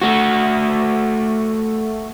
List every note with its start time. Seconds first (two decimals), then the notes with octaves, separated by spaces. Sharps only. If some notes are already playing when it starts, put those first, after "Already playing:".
0.02 A3 F#4